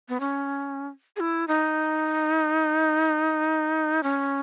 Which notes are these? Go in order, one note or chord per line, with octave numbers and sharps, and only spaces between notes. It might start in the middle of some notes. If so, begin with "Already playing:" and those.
B3
C#4
G#4
E4
D#4
C#4